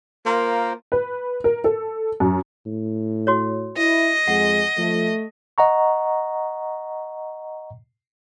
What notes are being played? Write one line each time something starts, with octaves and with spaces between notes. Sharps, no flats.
A#3 F4 A#4 C5
B4
A#4
A4
F#2
A2
F#4 C#5
E4 D#5
F2 G#3 F#5
F3 A3
D#5 F#5 A#5 C#6